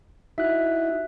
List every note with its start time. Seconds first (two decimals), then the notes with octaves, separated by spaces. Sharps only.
0.38 D#4 E4 F#4 E5 F#6